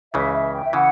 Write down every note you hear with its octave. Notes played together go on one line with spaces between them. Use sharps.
C#2 C#3 E3 E5
E5
G5
E5
C#3 E3 F#5